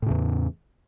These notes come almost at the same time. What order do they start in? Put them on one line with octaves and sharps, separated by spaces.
A2 C#3 E2